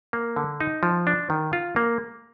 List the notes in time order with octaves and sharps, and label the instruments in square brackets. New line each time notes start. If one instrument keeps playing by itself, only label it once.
[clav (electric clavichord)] A#3
D3
D#4
F3
D4
D#3
F4
A#3